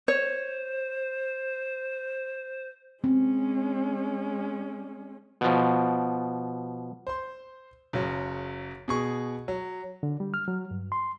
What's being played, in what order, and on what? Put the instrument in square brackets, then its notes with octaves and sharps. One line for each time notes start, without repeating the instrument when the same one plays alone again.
[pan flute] C5 [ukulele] C#5
[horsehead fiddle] G#3 C#4 [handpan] C4
[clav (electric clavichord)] B2 F3
[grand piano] C5 C6
F#1 C#3 F#3
B2 G#4 C#6
F#3
[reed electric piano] D3
G3
F6
F#3
G2
C6